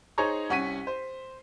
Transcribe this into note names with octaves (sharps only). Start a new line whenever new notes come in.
D#4 G#4 C5 C#5 A#5 C#6
C2 C#4 F#5 C#6 B6 D#7
C5